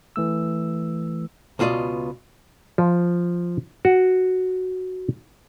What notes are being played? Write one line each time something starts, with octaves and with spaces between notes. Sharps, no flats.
E3 A3 E6
C#2 B2 F4 D5 D#5
F3
F#4